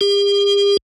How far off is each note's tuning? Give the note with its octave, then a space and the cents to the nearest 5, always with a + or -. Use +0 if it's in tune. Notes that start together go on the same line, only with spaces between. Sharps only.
G4 +45